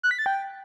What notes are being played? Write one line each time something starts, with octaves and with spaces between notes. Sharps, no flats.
F#6
B6
A6
G5